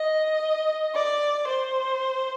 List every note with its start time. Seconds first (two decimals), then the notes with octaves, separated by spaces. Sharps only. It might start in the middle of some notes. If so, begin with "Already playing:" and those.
Already playing: D#5
0.94 D5
1.47 C5